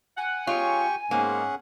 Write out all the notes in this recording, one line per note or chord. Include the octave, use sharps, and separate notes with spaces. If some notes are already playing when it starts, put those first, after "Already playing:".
F#5 G#5
G#3 C#4 F4 G4 C#5 G5 C#6
G#2 A#3 C#4 G#4 F#5